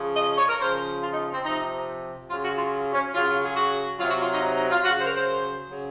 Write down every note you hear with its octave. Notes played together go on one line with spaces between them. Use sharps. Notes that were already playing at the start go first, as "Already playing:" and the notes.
Already playing: C#3 F3
D#5
C#5
A#4
C#3 F3 C5
F4
D#4
C4
C3 F3 D#4
C#3 F#3 F4
F#4
F4
C#4
C#3 F#3 F4
G#4
F#4
C3 F#3 F4
F#4
F4
D#4
D#4
D#4
F4
C#3 F#3 F#4
C5
A#4
C5
C#3 F#3